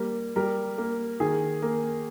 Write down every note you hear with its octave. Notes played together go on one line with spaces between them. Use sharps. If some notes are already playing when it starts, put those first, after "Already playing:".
Already playing: G3 A#3
G3 A#4
A#3
D#3 G#4
A#3